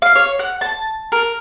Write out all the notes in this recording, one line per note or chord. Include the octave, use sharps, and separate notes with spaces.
F5
C#5
F#5
A5
A#4